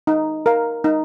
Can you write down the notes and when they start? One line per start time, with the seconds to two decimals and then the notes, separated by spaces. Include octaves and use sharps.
0.07 D#4
0.46 A#4 F5
0.84 D#4